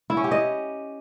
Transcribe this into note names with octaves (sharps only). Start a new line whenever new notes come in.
E4
C#4
G4
D#5